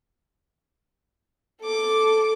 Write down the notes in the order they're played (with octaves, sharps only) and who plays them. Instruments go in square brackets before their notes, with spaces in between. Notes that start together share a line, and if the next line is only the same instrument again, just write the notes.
[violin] A4 D6